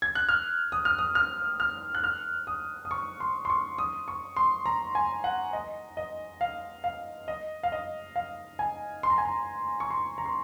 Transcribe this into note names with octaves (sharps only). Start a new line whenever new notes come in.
G#6
F#6
F6
D#6
F6
D#6
F6
F6
F#6
F6
D#6
D#6
C#6
C6
C6
C#6
D#6
C#6
C6
A#5
G#5
F#5
D#5
D#5
F5
F5
D#5
F5
D#5
F5
G#5
C6
A#5
G#5
A#5
C#6
C6
A#5
C6